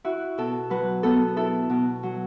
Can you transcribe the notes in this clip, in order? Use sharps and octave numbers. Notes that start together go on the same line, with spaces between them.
E4 F#4
B2 A4
F#3 B4
B3 A4
E4 A4
B2
F#3